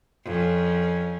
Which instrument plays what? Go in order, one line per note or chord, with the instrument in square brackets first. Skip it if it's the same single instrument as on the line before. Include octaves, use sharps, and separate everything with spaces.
[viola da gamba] F2 C#4